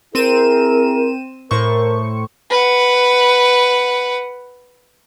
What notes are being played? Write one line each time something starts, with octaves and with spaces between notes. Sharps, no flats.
C4 E4 G#4 A#4 D#7 E7
A2 A#4 C5 C#6
B4 F#5